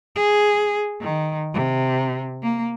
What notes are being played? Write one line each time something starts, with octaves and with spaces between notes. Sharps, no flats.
G#4
D#3
C3
A#3